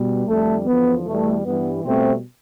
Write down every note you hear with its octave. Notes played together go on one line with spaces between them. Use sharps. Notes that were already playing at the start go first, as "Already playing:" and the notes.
Already playing: B2 G3
F2 D3 G3 A3
E2 D3 F3 B3
E2 B2 G3 A3
G2 E3 G3 B3
B2 G3 A3 C4